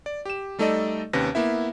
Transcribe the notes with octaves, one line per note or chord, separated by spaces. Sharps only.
D5
G4 E7
G3 A3 D#4 A4 D5 D#5
D#2 C3 C#4 B4 A#6
A#3 B3 E4 E5